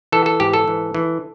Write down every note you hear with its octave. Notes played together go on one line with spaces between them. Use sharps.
E3 A4
A4
G#2 G4
A4
E3
E3